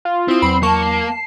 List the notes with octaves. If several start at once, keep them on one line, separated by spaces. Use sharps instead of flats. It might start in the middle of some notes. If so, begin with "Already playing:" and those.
F4
C4 E4 D#6
E2 F#3 B5 C7
A#3 A5 C#6
C7